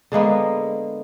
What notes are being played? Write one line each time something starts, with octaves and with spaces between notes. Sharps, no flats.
D3 G#3 A#3 B3